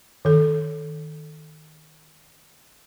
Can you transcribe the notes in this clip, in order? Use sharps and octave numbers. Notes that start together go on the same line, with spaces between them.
D#3 A4